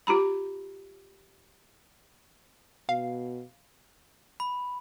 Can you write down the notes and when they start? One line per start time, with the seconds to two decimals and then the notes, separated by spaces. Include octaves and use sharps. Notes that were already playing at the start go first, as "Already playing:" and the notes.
0.07 F4 G4 A#5 B5
2.89 B2 F5
4.40 B5